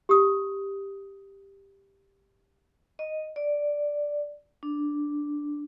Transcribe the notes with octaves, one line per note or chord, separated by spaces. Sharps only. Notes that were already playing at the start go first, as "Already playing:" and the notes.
G4 D#6
D#5
D5
D4